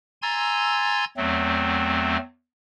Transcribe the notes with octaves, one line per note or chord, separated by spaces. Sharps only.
G#5 A#5 C6 E6 G#6 A6
E2 F#3 A3 C4